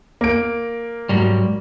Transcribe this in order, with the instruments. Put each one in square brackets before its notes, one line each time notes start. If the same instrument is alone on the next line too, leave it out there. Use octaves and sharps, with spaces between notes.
[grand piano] A#3 D7
[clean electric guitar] G#2 F#3 G3